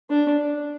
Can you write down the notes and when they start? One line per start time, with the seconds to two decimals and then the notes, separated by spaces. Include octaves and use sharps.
0.10 D4